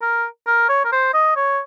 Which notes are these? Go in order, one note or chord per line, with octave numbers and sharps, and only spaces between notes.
A#4
A#4
C#5
A#4
C5
D#5
C#5